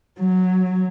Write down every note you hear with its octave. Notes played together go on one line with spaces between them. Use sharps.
F#3